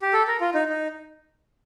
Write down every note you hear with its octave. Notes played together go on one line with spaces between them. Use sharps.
G4
A4
A#4
F4
D#4
D#4